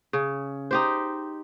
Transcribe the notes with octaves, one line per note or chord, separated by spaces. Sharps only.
C#3
D#4 G4 C5